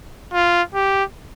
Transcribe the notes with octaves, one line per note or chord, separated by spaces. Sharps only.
F4
G4